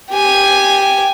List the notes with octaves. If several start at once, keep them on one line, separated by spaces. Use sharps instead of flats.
G4 G#5